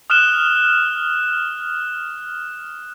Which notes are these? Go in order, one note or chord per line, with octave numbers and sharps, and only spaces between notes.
D#6 F6 F#6 E7 G7